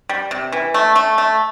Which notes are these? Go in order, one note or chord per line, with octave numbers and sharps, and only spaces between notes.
G3
C3
E3
A3
A3
A3